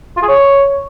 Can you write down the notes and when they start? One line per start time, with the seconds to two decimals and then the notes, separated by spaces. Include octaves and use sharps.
0.17 F4
0.22 G#4
0.28 C#5